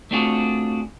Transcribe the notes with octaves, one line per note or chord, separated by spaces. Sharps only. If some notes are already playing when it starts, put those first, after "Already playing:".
A3 C4 D4 F4 F#4 G#4